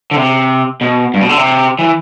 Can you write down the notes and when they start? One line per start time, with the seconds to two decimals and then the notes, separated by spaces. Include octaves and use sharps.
0.11 D3
0.16 C3
0.81 B2
1.14 G2
1.21 B2
1.29 D3
1.38 C3
1.79 E3